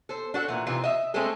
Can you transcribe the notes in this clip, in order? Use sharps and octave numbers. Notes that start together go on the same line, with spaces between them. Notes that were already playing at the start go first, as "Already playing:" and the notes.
A4 C5
D4 F#4 A4
A#2 E3
C3 E3 C4 D#4 F4
D#5 E5
G#3 A3 C4 D4 G#4 A4